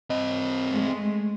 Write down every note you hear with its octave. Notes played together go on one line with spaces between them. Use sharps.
C4 D#5
G#3 A3